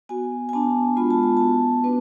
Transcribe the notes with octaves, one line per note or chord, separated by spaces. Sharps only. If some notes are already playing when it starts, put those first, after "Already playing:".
B3 F#4 G#5
G#5
B3 D4 F#4 A5
G#3 B3 F4 B5
A5
G#5
B3 F#4 A5
B3 D4 F#4 B4